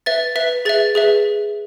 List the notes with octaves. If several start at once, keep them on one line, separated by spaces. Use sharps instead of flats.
B4 E5 A6
B4 E5 B6
G#4 B4 E5 A6
G#4 B4 E5